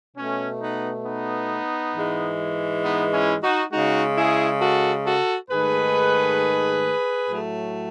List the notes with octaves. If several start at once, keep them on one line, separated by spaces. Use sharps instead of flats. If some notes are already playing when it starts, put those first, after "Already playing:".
B2 A3 C#4
B3 D#4
B3 D#4
G#2 E3 G#3
B3 D#4
C#4 E4
D#4 F#4
C#3 G#3 D#4 F#4
E4 G#4
F#4 A4
F#4 A4
G#2 D#3 A3 G#4 B4
A2 F#3 A3